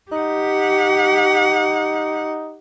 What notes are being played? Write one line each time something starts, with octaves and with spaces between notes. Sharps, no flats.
D#4 G4 F#5